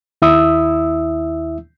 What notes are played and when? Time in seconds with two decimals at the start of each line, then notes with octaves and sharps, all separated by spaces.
0.22 D#2 E4 E5 D#6 E6